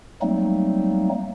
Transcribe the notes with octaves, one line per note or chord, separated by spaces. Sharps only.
F#3 G3 A3 A#3 C4 D#4